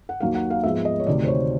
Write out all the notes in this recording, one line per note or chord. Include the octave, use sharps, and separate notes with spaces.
F#5
D#2 D#3 F#3 A#3 F5
F#5
F5
G#2 F3 G#3 B3 E5
D#5
C#5
D2 C3 D#3 D5
C5
C#5